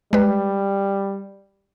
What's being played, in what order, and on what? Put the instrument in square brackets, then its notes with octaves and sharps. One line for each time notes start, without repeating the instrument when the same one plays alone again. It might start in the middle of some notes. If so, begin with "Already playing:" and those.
[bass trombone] G3 [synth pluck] G#3 B4